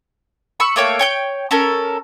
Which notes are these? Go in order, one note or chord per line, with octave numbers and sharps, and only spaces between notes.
B5 C#6 E6
A3 A#3 C#5 G5
C#5 G5 G6
C#4 A4 A#4